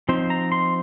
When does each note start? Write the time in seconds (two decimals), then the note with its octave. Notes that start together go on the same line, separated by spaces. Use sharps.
0.09 F3 C4 D#4 C5
0.30 A#5
0.52 C6